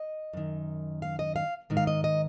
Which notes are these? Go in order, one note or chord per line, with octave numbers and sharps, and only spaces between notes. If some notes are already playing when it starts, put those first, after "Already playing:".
Already playing: D#5
F#2 D#3
F5
D#5
F5
G#2 D#3
F5
D#5
D#5